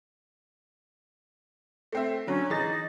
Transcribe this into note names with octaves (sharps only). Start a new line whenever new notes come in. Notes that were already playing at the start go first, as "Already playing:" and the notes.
A3 C4 E5
D3 F#3 C#4
E3 D#4 G#4 A6